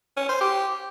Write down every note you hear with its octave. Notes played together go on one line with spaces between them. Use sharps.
C#4
C5
G4